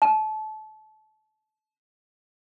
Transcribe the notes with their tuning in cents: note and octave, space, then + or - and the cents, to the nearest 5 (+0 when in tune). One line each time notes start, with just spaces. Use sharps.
A5 -25